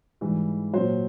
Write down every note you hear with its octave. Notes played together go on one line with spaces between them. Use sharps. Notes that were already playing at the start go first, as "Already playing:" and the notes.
G#2 E3 G3
A#2 F#3 C5